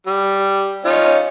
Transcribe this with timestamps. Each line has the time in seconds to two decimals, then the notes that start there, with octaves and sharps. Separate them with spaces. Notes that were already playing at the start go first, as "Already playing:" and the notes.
0.06 G3
0.85 C#4 D#4 F4